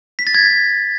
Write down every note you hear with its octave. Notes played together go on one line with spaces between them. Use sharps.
B6
A6
G#6